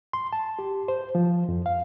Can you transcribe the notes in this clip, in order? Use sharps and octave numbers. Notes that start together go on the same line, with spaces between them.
C6
A5
G4
C5
F3
F2
F5